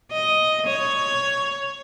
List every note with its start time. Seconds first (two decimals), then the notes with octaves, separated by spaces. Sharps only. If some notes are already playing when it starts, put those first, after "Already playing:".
0.12 D#5
0.67 C#5